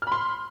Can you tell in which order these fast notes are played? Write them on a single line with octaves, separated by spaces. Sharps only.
F6 B5 C6